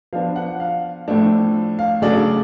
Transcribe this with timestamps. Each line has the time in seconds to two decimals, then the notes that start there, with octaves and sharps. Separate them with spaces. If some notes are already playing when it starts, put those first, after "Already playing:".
0.13 F3 B3 D4 F5
0.36 F#5
0.60 F5
1.08 A2 F3 A3 D4
1.79 F5
2.02 C#3 F#3 A3 D4 D5